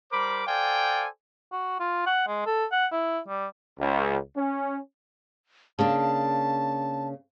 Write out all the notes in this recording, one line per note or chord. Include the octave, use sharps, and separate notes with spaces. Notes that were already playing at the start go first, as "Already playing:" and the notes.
G3 A#4 C5 B5 D6
A4 C5 D5 F5 G5 G#5
F#4
F4
F#5
G#3
A4
F#5
E4
G3
C#2
C#4
C#3 A#3 D4 A5